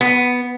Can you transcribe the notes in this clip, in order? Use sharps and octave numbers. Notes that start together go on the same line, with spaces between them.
B3